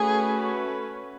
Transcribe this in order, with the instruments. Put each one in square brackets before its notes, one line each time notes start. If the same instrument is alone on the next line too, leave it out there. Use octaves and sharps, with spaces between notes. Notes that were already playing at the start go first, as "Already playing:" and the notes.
Already playing: [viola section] A3 C#4 F#4 B4 [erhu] G#4